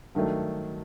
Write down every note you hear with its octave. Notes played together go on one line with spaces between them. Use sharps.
G2 D#3 F#3 A3